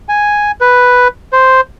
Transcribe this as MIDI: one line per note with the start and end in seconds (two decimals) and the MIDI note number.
0.09 0.51 80
0.61 1.08 71
1.33 1.61 72